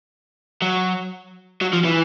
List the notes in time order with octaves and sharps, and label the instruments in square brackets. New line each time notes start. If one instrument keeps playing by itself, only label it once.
[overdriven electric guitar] F#3
F#3
F3
E3